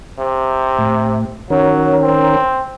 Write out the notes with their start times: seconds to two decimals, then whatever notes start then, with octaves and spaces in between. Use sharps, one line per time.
0.19 C3
0.78 A2
1.50 D#3 F#3 C#4 A#4
2.01 C4